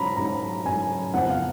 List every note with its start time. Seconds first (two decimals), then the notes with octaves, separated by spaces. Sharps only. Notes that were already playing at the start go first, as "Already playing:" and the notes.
Already playing: G#2 F#3 C#4 A#5 B5
0.17 G#2 F#3 C#4 A#5
0.66 G#2 F#3 C#4 G#5
1.13 F2 C#3 F3 B3 F#5
1.30 F5